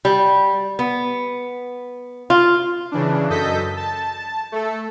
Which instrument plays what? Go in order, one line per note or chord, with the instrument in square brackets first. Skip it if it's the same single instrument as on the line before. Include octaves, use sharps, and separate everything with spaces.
[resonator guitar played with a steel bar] G3
B3
F4
[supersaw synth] C#3 E3 D4
F#2 A4 D#5 G6 B6
A5
A3 A4